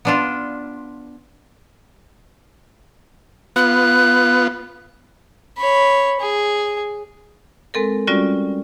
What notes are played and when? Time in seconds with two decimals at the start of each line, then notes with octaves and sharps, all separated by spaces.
0.05 B3 D4 F4
3.56 B3 F4 F#6
5.57 C#5 B5
6.20 G#4
7.74 G#3 C4 A4 A#4
8.07 G3 C#4 F4 F#4 D5